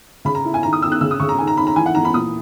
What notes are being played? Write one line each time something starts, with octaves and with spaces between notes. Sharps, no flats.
C#3 B5
A#5
E4
G#5
D#3 A#5
D#6
D#3 E6
F#6
C#3 E6
D#6
C#3 C#6
A#5
D#3 G#5
A#5
D#3 B5
A#5
E3 G#5
F#5
E3 A#5
B5
A#2 D#6